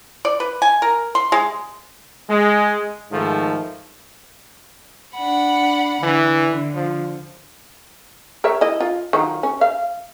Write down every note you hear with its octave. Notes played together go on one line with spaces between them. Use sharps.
D5
B4
G#5
A#4
C6
G#3
G#3
G#2 D#3 F3 A3
D4 F#5 B5
D3 E3
F3
A#4 C#5 E5
E4 D#5
F4
D#3 F#3 F4
C#4
F5